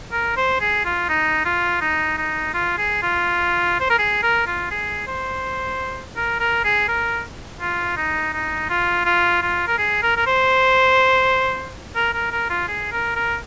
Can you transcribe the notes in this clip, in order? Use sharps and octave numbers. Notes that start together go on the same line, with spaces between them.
A#4
C5
G#4
F4
D#4
F4
D#4
D#4
F4
G#4
F4
C5
A#4
G#4
A#4
F4
G#4
C5
A#4
A#4
G#4
A#4
F4
D#4
D#4
F4
F4
F4
A#4
G#4
A#4
A#4
C5
A#4
A#4
A#4
F4
G#4
A#4
A#4